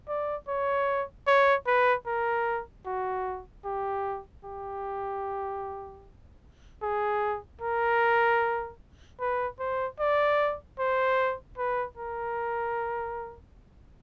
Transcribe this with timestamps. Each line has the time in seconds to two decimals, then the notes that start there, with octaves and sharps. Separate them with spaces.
0.08 D5
0.48 C#5
1.27 C#5
1.67 B4
2.07 A#4
2.86 F#4
3.65 G4
4.45 G4
6.82 G#4
7.61 A#4
9.20 B4
9.59 C5
10.00 D5
10.79 C5
11.58 B4
11.98 A#4